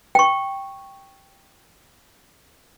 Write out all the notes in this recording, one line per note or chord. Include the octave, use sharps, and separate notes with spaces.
G5 C#6